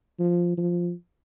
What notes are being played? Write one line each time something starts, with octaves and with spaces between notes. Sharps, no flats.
F3
F3